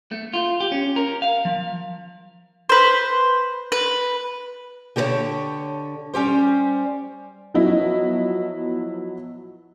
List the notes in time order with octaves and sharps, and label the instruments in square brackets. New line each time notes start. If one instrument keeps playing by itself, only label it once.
[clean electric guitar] A3
F4
G4
C#4
A#4
F5
F3
[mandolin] B4 C5
B4
[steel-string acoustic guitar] D3 G4 A4 B4 C#5 A5
G3 C#4 G4 C5
[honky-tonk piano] F3 F#3 B3 E4 D#5